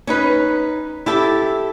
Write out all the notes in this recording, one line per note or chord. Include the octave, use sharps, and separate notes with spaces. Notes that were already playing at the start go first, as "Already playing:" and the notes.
C#4 D#4 B4
E4 G4 A4